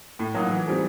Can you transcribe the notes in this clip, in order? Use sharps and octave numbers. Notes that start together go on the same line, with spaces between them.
A2
F#3 A#3 D#4 F#4
E3
G3 C4 D#4 G#4